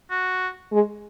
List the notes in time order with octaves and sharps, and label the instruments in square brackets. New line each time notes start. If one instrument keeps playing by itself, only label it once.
[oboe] F#4
[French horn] G#3